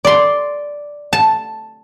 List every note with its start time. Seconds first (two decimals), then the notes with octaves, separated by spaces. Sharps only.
0.05 D5 C6
1.13 A5